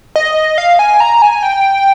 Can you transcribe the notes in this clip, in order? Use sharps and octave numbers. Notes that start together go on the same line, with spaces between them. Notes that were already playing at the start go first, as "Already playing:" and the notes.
D#5
F5
G#5
A#5
G#5
G5